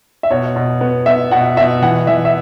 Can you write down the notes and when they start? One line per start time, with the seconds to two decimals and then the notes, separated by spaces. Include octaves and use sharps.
0.23 E5
0.30 B2 C#5
0.56 B2
0.81 B3
1.06 B3 E5
1.31 B2 F#5
1.57 B2 E5
1.82 E3 F#5
2.07 E3 E5
2.25 E5